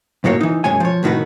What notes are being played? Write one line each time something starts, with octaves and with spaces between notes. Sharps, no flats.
B1 F#2 A2 F#3 A#3 C#5
E3 D#4
F#2 B2 G#3 C#5 G#5
F3 C#5
C2 A2 D#3 F#4 B4